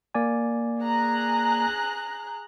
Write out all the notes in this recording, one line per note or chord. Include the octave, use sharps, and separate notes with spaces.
A#3 D5 G#5
G#4 A#5 F#6